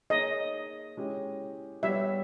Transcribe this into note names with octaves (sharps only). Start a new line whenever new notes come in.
A#3 D#4 G#4 C#5 D#5
G#3 C#4 E4 G4
G3 B3 G4 C#5 E5